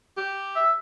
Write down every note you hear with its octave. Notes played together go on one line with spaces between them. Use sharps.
G4
E5